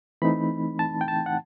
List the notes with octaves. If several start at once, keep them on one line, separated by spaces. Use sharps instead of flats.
E3 A3 C4 D#4 B5
A5
G5
A5
F#5